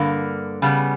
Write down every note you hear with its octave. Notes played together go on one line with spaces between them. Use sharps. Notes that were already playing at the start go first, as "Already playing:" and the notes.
Already playing: G2 D3 A#3
C#3 G3 B3